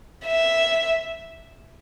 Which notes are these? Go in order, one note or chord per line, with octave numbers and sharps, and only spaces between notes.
E5